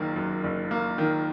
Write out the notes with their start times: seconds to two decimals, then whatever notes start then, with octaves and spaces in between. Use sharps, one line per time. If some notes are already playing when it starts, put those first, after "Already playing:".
Already playing: F#1 F#2 D#3 A#3
0.16 F#2
0.44 F#1
0.71 A#3
0.98 D#3